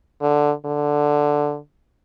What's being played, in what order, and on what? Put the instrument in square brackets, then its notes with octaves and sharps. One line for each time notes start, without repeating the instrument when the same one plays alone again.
[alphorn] D3
D3